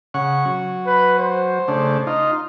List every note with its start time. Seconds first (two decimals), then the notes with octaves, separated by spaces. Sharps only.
0.14 C#3 F#5 C#6
0.45 F#3
0.86 B4
1.19 C5
1.68 C#3 A3 D4
2.07 D#4 F4